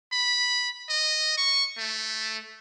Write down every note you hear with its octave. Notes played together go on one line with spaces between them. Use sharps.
B5
D#5
C#6
A3